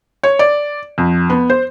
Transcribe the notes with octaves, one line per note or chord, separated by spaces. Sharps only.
C#5
D5
F2
B3
C5